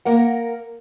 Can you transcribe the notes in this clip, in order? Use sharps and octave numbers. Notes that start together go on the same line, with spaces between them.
A#3 A#4 F#5